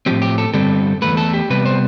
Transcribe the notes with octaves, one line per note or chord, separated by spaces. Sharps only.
A2 F3 C4 G4
G4
A4
G2 D3 G3 C4 A4
E2 B2 A3 B4
A4
G4
C3 G3 B3 B4
C5